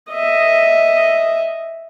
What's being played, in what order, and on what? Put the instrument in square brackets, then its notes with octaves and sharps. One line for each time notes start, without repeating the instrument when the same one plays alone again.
[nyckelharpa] D#5 E5